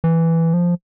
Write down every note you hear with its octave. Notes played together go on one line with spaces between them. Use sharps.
E3
F3